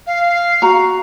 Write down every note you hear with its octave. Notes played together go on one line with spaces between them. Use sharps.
F5
F#4 A#5